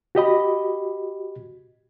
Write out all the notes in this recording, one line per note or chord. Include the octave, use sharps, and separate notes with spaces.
F#4 G4 D#5 B5